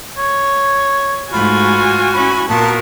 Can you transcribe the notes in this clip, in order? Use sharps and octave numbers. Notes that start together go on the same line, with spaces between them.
C#5
G#2 A3 F4 F#4 G#5 B5
C#4 E4 B5
A#2 B3 F#4 A#4 A5